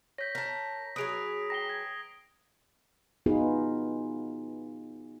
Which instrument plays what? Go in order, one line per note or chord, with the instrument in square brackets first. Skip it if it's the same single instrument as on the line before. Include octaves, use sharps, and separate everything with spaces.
[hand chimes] C#5 G6 [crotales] A#6 B6
[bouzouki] A#4 A5
[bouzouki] F#3 G#4 B4 [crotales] D#6 D7 F7
[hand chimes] G5 A#5 [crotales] A#6 C7 G7
[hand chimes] G#6
[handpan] B3 D#4 F4 F#4 G#4 B4